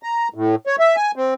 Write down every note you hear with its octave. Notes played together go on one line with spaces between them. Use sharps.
A#5
A2
C#5
E5
G#5
C4